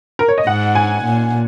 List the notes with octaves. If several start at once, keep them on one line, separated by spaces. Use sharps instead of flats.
A#4
C#5
D#5
G#2 F#5
G#5
A#2